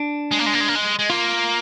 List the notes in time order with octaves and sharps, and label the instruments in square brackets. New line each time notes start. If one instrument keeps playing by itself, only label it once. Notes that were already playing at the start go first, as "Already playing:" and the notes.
Already playing: [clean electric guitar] D4
[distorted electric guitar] G#3
A#3
G#3
A#3
G#3
A#3
G#3
G#3
[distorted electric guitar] A#3 [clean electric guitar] F4